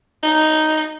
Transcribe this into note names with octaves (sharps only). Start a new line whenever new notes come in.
D#4